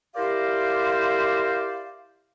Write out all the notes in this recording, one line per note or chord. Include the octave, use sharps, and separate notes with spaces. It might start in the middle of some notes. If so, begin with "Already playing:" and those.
E4 G4 A#4 C5 D5 F5